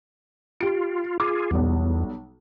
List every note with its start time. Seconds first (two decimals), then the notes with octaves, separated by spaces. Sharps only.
0.61 F4 G4 D7
1.20 F4 G#4 D6
1.51 B1 E2 G3 B3